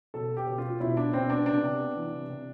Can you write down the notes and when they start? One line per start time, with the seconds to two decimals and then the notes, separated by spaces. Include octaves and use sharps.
0.14 B2 A4
0.31 B3
0.37 G4
0.47 B2
0.58 F4
0.64 B3
0.80 B2 E4
0.97 B3 D4
1.13 B2 C4
1.30 B3 D4
1.46 C3 D4
1.63 C3
1.79 B3
1.96 E3
2.12 C3
2.29 C3